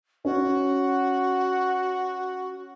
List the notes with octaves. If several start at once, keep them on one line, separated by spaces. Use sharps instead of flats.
C#4 F#4